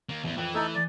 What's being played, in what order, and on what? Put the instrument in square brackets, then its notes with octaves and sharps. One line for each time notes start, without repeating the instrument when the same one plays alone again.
[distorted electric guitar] D#3 A#3
[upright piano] A1 G7 [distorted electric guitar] E2
[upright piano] F2 G5 F#6 [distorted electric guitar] E3
[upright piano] A3 E4 A#5 [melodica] D#4 A4
[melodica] D5